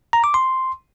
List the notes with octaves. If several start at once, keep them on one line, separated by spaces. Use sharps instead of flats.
A#5
D6
C6